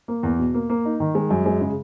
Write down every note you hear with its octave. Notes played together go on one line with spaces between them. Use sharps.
A#3
E2
B2
A#3
A#3
D#4
D#3
G#3
F#2
G#3
C#3